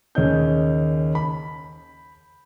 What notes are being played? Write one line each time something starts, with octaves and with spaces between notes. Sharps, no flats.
D#2 C#3 C#4 D#4 G6
B5